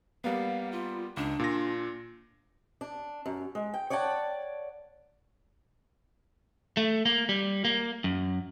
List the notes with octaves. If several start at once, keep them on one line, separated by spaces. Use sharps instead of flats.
G3 A#3 B3 F5
F4
C#2 D4
A#2 F4 A#6
D4
F#2
G#3
G5
C#5 D5 F#5 G5 A5
A3
A#3
G3
A#3
F#2